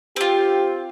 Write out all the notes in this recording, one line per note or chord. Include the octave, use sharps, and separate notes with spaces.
C4 F4 G4